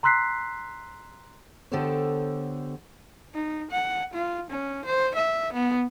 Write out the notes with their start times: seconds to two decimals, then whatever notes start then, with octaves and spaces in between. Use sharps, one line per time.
0.03 A#5 C6 E6 F#6 B6 C7
1.72 D3 B3 G4 A4 C5 C#5
3.34 D#4
3.71 F#5
4.14 F4
4.50 C#4
4.85 C5
5.15 E5
5.53 B3